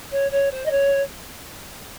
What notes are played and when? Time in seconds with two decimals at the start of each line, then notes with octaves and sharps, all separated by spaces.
0.11 C#5
0.31 C#5
0.51 C5
0.65 D#5
0.70 C#5